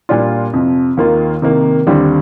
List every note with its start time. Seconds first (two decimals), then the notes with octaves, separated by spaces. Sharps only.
0.09 A#2 G3 D4 F4
0.53 F2 C3 F3
0.97 D#2 D#3 A#3 F4
1.42 C3 D#3 A#3
1.87 D#2 D3 G3 C4